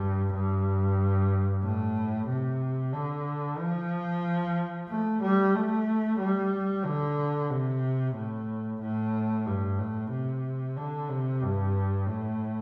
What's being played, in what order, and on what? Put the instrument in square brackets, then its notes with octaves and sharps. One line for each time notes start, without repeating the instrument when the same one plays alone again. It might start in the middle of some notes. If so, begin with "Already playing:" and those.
Already playing: [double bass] G2
G2
A2
C3
D3
F3
A3
G3
A3
G3
D3
C3
A2
A2
G2
A2
C3
D3
C3
G2
A2